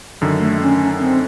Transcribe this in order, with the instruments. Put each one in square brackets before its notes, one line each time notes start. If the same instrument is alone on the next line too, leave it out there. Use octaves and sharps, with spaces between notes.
[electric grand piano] F#2 D3 D#3
[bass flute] A3
C#4
C4